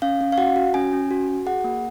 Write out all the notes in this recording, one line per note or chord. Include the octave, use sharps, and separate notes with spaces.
C#4 F5
C#4
F5
F#4 F#5
F#4
C#4 G#5
C#4
F#4
F#4
G#4 F#5
A#3